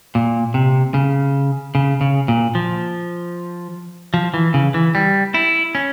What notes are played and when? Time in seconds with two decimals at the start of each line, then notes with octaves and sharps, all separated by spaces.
0.15 A#2
0.54 C3
0.94 C#3
1.75 C#3
2.01 C#3
2.28 A#2
2.55 F3
4.14 F3
4.34 E3
4.54 C#3
4.74 E3
4.95 G3
5.34 E4
5.75 C#4